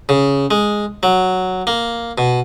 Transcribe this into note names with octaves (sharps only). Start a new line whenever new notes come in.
C#3
G#3
F#3
A#3
B2